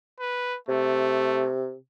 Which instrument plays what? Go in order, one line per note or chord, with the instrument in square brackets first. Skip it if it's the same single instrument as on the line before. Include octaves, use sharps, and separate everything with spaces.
[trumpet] B4
[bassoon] C3 [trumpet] A3